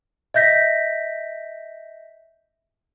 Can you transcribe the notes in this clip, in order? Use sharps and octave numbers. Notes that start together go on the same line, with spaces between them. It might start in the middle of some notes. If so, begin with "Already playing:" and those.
D#5 E5 G6 A#6 B6